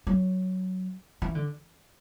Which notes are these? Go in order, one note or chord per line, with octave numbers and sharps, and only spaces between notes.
F#3
E3
D3